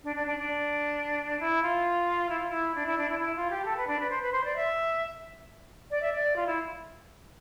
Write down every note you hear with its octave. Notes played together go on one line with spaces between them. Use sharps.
D4
D4
D4
D4
E4
F4
E4
F4
E4
D4
E4
D4
E4
E4
F4
G4
A4
B4
D4
B4
C5
B4
C5
D5
E5
D5
E5
D5
F4
E4